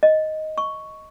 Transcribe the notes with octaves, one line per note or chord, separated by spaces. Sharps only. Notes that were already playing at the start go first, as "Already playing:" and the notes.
D#5
C#6